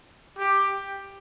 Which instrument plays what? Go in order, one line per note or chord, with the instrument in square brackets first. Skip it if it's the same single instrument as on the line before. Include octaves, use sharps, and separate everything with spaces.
[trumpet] G4